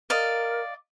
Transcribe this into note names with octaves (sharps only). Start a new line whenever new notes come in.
A#4 D5 D#5 F5